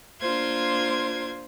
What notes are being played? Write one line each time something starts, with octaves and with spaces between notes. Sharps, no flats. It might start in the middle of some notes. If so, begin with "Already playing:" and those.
A#3 D4 F4 C5 C6 G#6